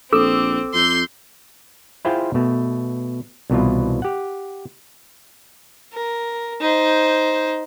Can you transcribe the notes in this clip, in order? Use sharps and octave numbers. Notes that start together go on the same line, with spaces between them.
A#1 C4 A4 D6 E6
F2 C6 G6
E4 F4 G#4 C5 F5 G5
B2 A3
C2 B2 E3 F4
G4 F#5
A#4
D#4 C5